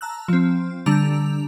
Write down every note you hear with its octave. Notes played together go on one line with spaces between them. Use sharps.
A5 A#5 E6 F#6
F3 C4
D3 G3 D4 A#5 E6 F7